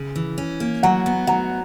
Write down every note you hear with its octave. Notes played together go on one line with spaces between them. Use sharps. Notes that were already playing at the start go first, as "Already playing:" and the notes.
Already playing: C#3
E3
C#4
A#3
F#3 F#5 A#5
B3
F#3 F#5 A#5